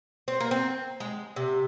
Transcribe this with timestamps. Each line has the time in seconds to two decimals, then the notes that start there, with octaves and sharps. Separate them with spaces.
0.28 C4
0.40 A#3
0.51 C4
1.00 G#3
1.36 C3